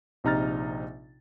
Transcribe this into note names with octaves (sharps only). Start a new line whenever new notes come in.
A#1 C3 D#4 A#5 F6 A6